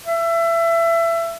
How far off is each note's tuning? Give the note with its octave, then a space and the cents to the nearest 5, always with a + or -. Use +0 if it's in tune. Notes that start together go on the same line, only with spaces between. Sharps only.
E5 +25